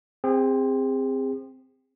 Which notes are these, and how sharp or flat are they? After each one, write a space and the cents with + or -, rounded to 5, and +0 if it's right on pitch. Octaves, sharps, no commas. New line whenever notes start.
C4 +0 G#4 -35